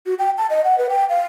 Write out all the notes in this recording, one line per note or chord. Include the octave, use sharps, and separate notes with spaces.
F#4
G5
A5
D#5
F#5
B4
G5
F5